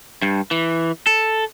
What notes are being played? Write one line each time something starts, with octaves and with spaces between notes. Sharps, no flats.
G2
E3
A4